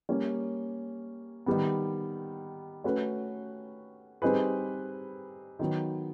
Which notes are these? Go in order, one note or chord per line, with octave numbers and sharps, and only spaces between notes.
G3 A#3 C#4
D#3 G3 B3
A3 C#4 F#4 B4
G3 C4 D#4 G#4 B4
D#3 F#3 B3